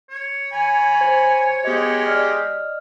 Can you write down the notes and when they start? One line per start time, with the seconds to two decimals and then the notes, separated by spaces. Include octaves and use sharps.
0.10 C#5
0.53 G#5 B5
1.01 C5
1.64 G#3 B3 G4 D#5
2.06 D5 D#5 F6